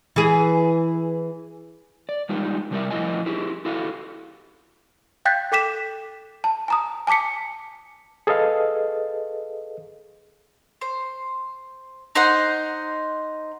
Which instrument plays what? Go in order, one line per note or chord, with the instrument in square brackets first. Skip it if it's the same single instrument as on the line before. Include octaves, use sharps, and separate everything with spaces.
[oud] E3 G#4
[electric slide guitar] D5
G3 G#3 D#4 F4 G4
C3 G3 F#4 A#4 D5 E5
A2 F3 E4 F4 D#5 G#5
E4 G4 G#4
E4 F#4 G4 A4 F5
[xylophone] F5 G5 F#6 G6 A6 B6
A4 G5 D6 B6 E7
A5
G#5 A#5 D#6
G#5 A5 D6 B6 C#7
[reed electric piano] G#4 A4 B4 D#5 F5
[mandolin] C5
D#4 C5 F#5